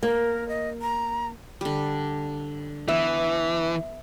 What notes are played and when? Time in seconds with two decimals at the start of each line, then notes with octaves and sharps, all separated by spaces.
0.03 A#3 A#4
0.49 D#5
0.81 A#5
1.61 D3 G3
2.88 E3 B3 E5